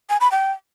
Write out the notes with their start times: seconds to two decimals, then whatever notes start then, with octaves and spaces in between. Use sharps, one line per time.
0.10 G#5
0.21 B5
0.32 G5